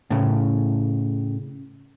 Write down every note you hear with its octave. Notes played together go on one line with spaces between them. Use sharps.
A2 C#3